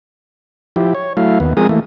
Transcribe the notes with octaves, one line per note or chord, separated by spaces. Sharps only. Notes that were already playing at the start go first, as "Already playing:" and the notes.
F3 E4 G4
C#5
F#3 A3 E4 F5
D#2 B3
F3 G#3 C4 G#4 A#4 D#6
E3 A3 A#3